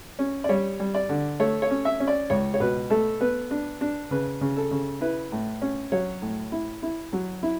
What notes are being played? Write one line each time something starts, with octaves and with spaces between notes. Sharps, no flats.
C#4
D5
G3 C#5
G3
D5
D3
A3 C#5
C#5
C#4
E5
C#4
D5
C#2 C#5
C#5
B2 B4
A3 A4
B3 B4
D4
D4
C#3 B4
C#3
A4
C#3
E4 B4
A2
C#4
F#3 C#5
A2
E4
E4
F#3
E4